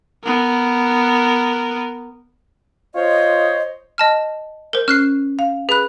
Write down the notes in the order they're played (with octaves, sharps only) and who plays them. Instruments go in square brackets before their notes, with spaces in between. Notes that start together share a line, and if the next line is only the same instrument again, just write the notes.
[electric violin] B3 A#4
[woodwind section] F4 C5 C#5 D#5
[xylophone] D#5 A5 F6
A#4 C5
[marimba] C#4 [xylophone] F6 F#6 C7
[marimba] F5
[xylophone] G#4 F#6 [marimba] B4 B5